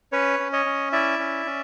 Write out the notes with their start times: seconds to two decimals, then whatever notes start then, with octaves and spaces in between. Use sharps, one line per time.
0.12 C#4 B4 C#5
0.39 C#4
0.53 C#5 D#5
0.66 C#4
0.92 E4 D5 E5
1.19 C#4
1.46 C#4